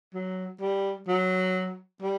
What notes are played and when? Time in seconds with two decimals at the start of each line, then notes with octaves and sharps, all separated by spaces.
0.14 F#3
0.60 G3
1.08 F#3
2.02 G3